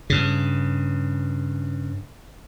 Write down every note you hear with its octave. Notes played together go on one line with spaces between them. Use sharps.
G2 C#3